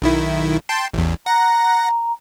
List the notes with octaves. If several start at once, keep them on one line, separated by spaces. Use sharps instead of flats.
B1 D#3 E4
G5 A5 C6
A1 E2
F#5 A#5 A#6